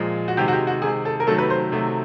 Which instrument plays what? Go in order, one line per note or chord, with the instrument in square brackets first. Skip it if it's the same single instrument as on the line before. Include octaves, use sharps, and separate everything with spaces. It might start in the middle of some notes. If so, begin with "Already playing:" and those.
Already playing: [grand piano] A#2 F3 G#3
F#4
C3 D#3 G#3 G4
F#4
G4
F#4
C3 D#3 G#3 G#4
A4
A#4
C3 D#3 F#3 A3 A4
B4
C5
C3 D#3 F#3 A3